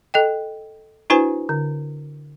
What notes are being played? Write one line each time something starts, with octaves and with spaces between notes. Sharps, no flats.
A4 D#5 G5
D4 E4 F#4 B4 C5 G#5
D3